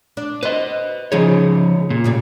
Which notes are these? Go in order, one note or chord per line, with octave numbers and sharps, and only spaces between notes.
D4
B4 C5 D#5
C#3 F3 D#4 G#4 C#5
A#2
A2 C#3 G3